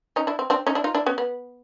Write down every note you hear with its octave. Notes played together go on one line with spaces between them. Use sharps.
C#4 D#4
D4 E4
C4
C4 D4
C#4 D#4
D4 E4
D#4 F4
D4 E4
B3 C#4
B3